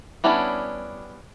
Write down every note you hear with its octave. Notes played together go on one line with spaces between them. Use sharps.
G3 B3 C#4 D4 E4